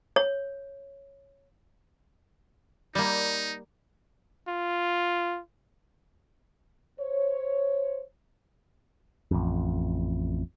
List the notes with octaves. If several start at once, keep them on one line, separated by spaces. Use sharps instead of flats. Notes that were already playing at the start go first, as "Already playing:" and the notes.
C#5
G3 A#3 D#4
F4
C5 C#5
A1 F2